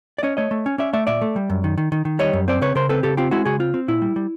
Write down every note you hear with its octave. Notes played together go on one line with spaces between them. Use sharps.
D5
C#4 C#5 D#5
A3 C#5 D#5
A3
C#4
C#4 D5 E5
A3 D5 E5
A#2 D5 E5
A3
G3
F#2
D#3
D#3
D#3
D#3
G3 C#5 D#5
F#2
C4 C5 D5
C#3 B4 C#5
C#3 A#4 C5
C4 A4 B4
C#3 G4 A4
C4 F4 G4
G#3 E4 F#4
C#3 F#4 G#4
C4 F4
C4
A#2 E4
G3
G3